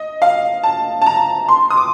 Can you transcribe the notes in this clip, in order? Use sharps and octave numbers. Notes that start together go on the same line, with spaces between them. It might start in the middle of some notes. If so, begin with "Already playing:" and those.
Already playing: D#5
F5
A5
A5
A#5
C6
D#6
D6